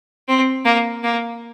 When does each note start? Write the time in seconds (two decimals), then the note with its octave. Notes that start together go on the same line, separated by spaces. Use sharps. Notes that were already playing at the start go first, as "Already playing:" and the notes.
0.29 C4
0.65 A#3
1.03 A#3